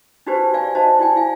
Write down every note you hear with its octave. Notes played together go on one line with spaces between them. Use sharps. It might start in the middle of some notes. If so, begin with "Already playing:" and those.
D4 D#4 F#4 G4 B4 C5
D5 F5 G#5
D#4 F#4 C5 D#5 A5
E4 D5 G5 G#5
E4 F5 G#5